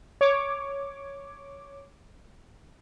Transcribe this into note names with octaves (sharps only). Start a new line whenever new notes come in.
C#5 D6